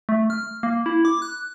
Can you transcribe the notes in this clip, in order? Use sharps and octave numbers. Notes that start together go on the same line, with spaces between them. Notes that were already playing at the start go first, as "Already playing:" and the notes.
A3
F6
A#3
E4
D6
F#6